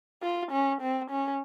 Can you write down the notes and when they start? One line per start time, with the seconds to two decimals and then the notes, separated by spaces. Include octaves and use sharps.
0.23 F4
0.52 C#4
0.81 C4
1.11 C#4